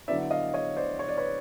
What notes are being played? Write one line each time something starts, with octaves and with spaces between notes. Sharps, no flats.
D3 F#3 B3 E4 D5 E5
D#5 F5
C#5 D#5
C5 D5
C#5
D5
B4 C#5